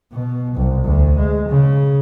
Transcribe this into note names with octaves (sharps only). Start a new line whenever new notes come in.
B2
C2
D2
G#3
C#3